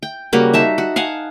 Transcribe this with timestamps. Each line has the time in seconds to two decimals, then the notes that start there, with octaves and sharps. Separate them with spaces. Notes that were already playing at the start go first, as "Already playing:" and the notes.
0.03 G5
0.33 C#3 G3 A#3 F#4
0.53 D#4 E5 A5
0.78 F#4
0.96 F5 F#5 G#5 A5